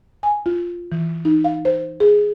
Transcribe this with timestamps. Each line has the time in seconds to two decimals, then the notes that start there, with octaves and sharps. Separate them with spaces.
0.23 G#5
0.46 F4
0.92 E3
1.25 D#4
1.44 F5
1.65 C5
2.00 G#4